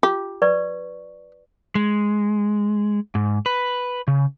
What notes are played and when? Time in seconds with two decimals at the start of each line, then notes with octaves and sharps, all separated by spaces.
0.03 F4 G4
0.42 B4 D5 C#6
1.75 G#3
3.15 G#2
3.46 B4
4.08 C#3